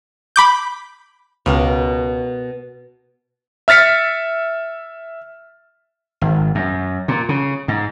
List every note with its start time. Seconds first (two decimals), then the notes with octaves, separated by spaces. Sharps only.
0.36 B5 D6 G6
1.46 C#2 B2 A#4
3.68 E5 F6 A6 B6 C#7
6.21 G#1
6.55 F#2
7.08 A#2
7.29 C#3
7.68 G#2